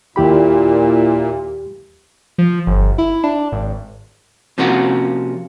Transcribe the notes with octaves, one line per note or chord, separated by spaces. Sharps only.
D#2 A#2 E4 G4 B5
F3
G1
E4
D4
G#1
C3 F3 A#3 C#4 F4 F#4